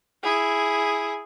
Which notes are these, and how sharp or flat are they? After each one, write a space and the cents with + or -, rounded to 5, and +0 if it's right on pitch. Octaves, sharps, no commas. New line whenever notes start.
E4 +0 G#4 +0